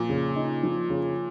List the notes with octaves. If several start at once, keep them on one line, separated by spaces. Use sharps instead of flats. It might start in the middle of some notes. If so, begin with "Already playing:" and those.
Already playing: A#2 F3
C#3
D#4
F3
C#3